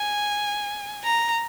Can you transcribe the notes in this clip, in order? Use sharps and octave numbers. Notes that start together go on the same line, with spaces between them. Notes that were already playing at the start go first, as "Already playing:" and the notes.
Already playing: G#5
A#5